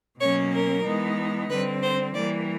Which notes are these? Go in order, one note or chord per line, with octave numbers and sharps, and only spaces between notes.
B2 F#3 A#3 C#4 C#5
A#4
E3 G#3 B3 D#4
D3 G3 C4 B4
C5
E3 G3 A#3 D5